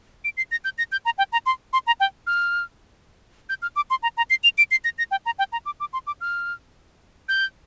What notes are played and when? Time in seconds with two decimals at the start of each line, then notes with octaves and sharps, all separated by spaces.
0.24 D7
0.37 C7
0.51 A#6
0.65 G6
0.78 A#6
0.92 G6
1.05 A#5
1.18 G5
1.33 A#5
1.46 C6
1.73 C6
1.87 A#5
2.00 G5
2.27 F6
3.49 G6
3.62 F6
3.76 D6
3.90 C6
4.03 A#5
4.17 A#5
4.30 C7
4.44 F7
4.58 D7
4.71 C7
4.84 A#6
4.98 A#6
5.11 G5
5.26 A#5
5.39 G5
5.52 A#5
5.66 D6
5.80 D6
5.93 C6
6.07 D6
6.21 F6
7.29 G6